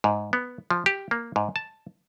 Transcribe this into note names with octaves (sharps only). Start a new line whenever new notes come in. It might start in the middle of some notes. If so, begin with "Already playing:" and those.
G#2
B3
F3
G4
A#3
G#2
A5